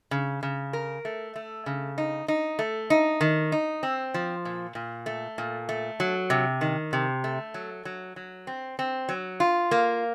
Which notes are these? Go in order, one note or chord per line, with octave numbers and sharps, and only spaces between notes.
C#3
C#3
A#4
A3
A3
C#3
D#4
D#4
A3
D#4
D#3
D#4
C4
F3
A#2
A#2
A3
A#2
A3
F#3
C3
D#3
C3
A3
F#3
F#3
F#3
C4
C4
F#3
F4
A#3